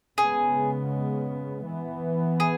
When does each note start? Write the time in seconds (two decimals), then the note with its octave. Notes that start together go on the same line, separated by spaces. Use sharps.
0.18 C#3 G#3 B3 G#4
1.65 E3 B3
2.40 G#4